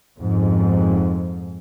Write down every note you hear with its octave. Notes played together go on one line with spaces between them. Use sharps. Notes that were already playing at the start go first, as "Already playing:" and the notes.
F2 G#2